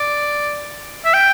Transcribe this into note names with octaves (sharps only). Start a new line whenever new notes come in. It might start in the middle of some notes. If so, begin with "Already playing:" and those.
Already playing: D5
E5
G5